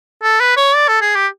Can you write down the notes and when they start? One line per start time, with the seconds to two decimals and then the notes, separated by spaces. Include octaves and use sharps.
0.23 A4
0.40 B4
0.57 C#5
0.76 D5
0.88 A4
1.01 G#4
1.15 G4